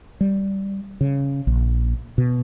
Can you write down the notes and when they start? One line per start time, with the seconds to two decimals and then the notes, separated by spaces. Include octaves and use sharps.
0.21 G3
1.01 C#3
1.47 A#1
2.18 B2